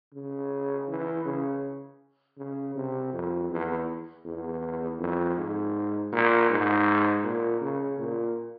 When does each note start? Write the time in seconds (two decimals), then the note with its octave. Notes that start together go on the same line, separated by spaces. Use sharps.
0.14 C#3
0.89 E3
1.25 C#3
2.38 C#3
2.76 C3
3.13 F2
3.50 E2
4.25 E2
4.99 F2
5.37 G#2
6.12 A#2
6.50 G#2
7.24 A#2
7.61 C#3
7.99 A#2